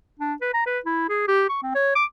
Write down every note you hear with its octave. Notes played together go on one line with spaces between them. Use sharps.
D4
B4
A#5
B4
E4
G#4
G4
C#6
C4
C#5
D6